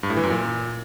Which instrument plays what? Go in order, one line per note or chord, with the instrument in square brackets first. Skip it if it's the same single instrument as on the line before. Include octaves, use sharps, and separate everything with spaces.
[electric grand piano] G2
A2
E3
F#2
A#2